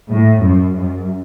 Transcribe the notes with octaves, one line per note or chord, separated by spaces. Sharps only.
A2
F#2
F#2